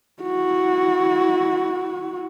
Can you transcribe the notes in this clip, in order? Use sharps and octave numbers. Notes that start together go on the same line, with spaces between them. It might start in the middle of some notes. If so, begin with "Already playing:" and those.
E4 F#4